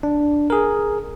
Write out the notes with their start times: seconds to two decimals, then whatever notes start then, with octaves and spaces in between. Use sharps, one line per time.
0.03 D4
0.50 G#4 A#4